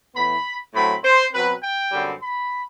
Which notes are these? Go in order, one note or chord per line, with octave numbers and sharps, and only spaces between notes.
A2 E3 B3 B5
A2 F#3 A3 C4 B5
C5
B2 F#3 C4 B4
G5
F#2 D3 G3 C4
B5